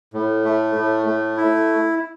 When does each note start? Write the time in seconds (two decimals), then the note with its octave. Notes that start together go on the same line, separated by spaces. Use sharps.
0.14 A2
0.45 A3
0.75 A2
1.06 A3
1.37 E4